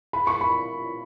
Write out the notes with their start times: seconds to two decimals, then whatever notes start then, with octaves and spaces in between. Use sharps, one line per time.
0.13 B5
0.27 C#6
0.41 B5